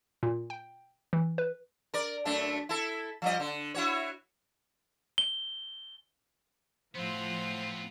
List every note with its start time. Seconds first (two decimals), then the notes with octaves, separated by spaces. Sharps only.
0.23 A#2
0.50 G5
1.13 E3
1.38 B4
1.94 A#4 D5
2.25 F#2 A3 D4
2.69 E4 A4
3.22 F3 G3 D#5
3.40 D3
3.74 E4 F#4 C#5
5.18 G7
6.96 A2 F3 B3 C4 F4 C5 F#5